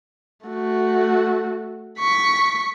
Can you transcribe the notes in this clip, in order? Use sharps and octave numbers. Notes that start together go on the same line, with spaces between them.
A3 F#4
C#6 B6